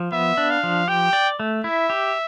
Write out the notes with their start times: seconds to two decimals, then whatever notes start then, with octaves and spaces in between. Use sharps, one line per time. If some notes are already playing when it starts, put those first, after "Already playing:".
Already playing: F3
0.12 B3 E5
0.37 D4
0.50 F5
0.63 F3
0.88 G4 G5
1.13 D5
1.40 A3
1.64 E4 E5
1.90 G4